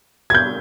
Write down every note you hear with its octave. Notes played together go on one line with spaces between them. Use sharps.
G#6
G6